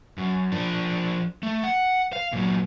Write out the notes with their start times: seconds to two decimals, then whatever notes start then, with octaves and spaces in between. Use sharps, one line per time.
0.18 F#2
0.52 F3 D4
1.43 A3
1.63 F#5
2.13 F5
2.33 A#2 F#3